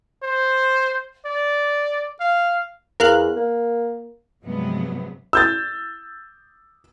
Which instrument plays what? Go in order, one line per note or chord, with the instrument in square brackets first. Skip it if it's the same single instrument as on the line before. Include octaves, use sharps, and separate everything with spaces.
[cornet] C5
D5
F5
[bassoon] E2 [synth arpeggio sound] A#4 F5 F#6
[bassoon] A#3
[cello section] G2 C3 F3 F#3 G#3 B3
[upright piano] E6 G6 A6